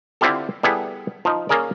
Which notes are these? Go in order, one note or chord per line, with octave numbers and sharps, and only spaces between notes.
D3 C4 E4 F4 G4 A4
G3 B3 E4 G#4 A4
F3 D#4
A#3 C#4 G#4 A#4 D5